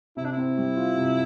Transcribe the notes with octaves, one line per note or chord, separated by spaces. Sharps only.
C3 E4
D4
C4 E4
G3
F4
C3